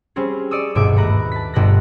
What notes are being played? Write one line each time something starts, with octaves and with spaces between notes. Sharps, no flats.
G3 C4 C#4 G#4
D5 C#6 D#6 E6
G1 D#2 G#2 B2 E5 D6
A3 B4 A#5 F#6
A5 B6
G1 B2 D5 F#6 A#6